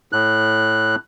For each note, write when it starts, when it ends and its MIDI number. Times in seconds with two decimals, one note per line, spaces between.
0.13 0.96 45
0.13 0.96 90